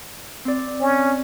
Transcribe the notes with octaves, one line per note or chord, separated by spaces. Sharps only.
C4 D5
C#4